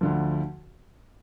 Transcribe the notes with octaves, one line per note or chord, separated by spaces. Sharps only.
D2 D3 F3